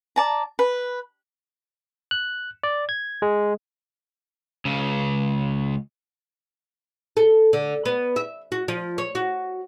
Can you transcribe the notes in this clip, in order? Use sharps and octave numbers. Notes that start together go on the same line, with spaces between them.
D5 A5 A#5
B4
F#6
D5
G#6
G#3
C#2 C#3
A4
D3
B3
E5
F#4
F3
C#5
F#4